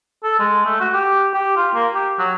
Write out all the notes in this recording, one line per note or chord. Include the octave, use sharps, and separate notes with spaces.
A4
G#3
A3
F#4
G4
G4
F4
A#3
G4
F#3